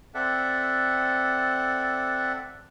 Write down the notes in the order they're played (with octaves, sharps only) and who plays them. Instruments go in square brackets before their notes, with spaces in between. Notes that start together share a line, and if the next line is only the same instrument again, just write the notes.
[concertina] C4 A4 D5 E5 F#5